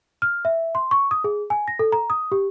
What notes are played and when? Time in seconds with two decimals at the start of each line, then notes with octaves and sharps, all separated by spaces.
0.22 F6
0.45 E5
0.75 C6
0.91 C#6
1.11 D#6
1.24 G#4
1.50 G#5
1.68 A#6
1.79 A4
1.92 A#5
2.10 D#6
2.32 G4